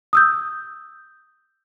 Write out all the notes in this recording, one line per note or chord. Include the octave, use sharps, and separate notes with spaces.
D#6 E6 G6